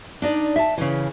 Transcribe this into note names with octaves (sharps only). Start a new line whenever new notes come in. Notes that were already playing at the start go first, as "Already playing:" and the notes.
D4 D#4 D5
E5 A5
C#3 E3